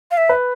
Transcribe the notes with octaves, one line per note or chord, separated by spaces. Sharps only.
F5
E5
B4